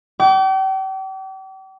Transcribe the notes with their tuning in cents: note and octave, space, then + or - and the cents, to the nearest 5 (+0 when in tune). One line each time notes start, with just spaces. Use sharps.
G5 -40 D6 -35